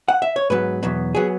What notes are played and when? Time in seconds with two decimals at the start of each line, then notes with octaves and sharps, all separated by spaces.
0.08 F#5
0.22 E5
0.36 C#5
0.50 G#2 F#3 B3 B4
0.83 E2 B2 F#3 B3
1.15 F#3 B3 G#4